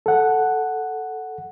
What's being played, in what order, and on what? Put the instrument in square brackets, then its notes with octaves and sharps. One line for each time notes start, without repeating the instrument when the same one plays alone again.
[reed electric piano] A4 F#5